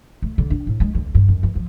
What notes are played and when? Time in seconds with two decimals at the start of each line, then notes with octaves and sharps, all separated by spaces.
0.22 A3
0.38 D3
0.50 D4
0.67 A2
0.80 G#3
0.95 D2
1.15 G2
1.28 F#2
1.43 E3
1.55 F3